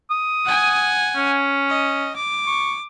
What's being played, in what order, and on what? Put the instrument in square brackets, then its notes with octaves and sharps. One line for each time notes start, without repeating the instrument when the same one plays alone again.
[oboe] D#6
[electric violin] F#5 G#5
[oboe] C#4
[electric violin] D#5
D6
[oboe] C#6